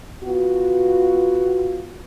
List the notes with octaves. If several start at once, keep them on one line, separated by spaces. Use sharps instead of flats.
B3 F4 F#4